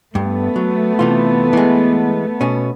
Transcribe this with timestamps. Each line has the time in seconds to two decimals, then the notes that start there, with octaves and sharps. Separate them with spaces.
0.15 G2 A3 B3
0.56 F#3
0.99 C3 E3 F4
1.53 E3 G#3
2.41 B2 C#4